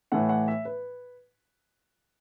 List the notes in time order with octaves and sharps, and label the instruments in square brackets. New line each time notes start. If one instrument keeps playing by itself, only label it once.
[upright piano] A2 E3 A3 F#5
F#5
E5
B4